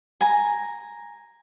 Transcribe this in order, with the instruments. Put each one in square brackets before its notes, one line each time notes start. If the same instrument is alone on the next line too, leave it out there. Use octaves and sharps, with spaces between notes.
[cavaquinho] G#5 A#5